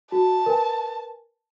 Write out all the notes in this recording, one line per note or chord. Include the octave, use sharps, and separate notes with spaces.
F#4 A5
A#4 B4 G#5